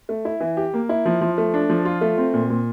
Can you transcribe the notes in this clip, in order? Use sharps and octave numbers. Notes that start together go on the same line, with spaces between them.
A3
E4
E3
G4
A#3
E4
F3
F3
A3
D4
F3
F4
A3
C4
A#2
A#2